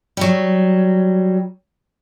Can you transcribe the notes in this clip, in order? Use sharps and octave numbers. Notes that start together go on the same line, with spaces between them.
F#3 G3